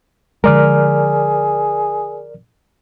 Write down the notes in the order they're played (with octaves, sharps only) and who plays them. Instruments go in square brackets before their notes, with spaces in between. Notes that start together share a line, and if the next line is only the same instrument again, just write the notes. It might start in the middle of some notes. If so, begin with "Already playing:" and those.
[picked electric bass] D3 F3 G#3 [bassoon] G#4 [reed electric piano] A#4 D5 F6